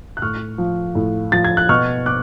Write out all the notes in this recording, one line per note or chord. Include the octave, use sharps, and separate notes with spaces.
F#6
A2 C#6 F6
F3
A2
F3 A6
G#6
F#6
B2 C#6 F6
D6 F#6